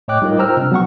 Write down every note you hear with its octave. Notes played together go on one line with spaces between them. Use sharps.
A2 C#5 D#5 G5 D6 F#6
G3 D#4 F4 A#4 D#5
C5 G5 A#5 E6 F6
C3 D4
F#3 B3 F#5 C#6